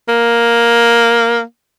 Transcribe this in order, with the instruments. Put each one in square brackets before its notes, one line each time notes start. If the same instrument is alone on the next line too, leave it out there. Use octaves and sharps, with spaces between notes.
[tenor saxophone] A#3